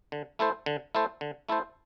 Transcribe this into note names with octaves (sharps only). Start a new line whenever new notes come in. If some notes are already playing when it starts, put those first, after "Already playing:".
D3
A3 E4 A4 C5
D3
A3 E4 A4 C5
D3
A3 E4 A4 C5